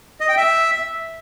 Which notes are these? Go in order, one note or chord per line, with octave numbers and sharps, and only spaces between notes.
D#5
G5
E5